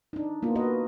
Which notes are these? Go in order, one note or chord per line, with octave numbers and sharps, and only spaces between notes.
D4 D#4
A#3 B3 F4
F#4 A#4 B4 D#5